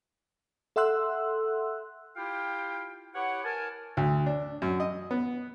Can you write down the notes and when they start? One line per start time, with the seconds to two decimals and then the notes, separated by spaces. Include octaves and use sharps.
0.76 A4 E5 F#5 C6 E6 F#6
2.16 E4 F4 G4 F5 G5
3.14 E4 G4 B4 C#5 F#5
3.44 A#4 G#5 A5
3.97 D2
4.26 D4
4.62 F#2
4.80 D#5
5.11 B3